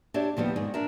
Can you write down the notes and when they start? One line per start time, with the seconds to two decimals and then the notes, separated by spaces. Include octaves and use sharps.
0.14 D4 G4 C#5 D5 E5
0.37 D#2 F3 G3 B3
0.56 G#2 D#3 G#4
0.74 D4 A#4 E5